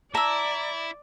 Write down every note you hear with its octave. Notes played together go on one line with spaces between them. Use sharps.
E4 D5 A5 A#5 E6